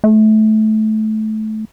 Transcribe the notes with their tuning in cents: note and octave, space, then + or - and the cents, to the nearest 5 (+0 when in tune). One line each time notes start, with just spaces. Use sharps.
A3 -20